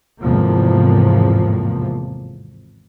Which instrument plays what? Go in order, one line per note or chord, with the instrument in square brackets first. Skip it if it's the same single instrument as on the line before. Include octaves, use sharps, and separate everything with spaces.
[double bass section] G#1 E2 A2 C3 F3 A#3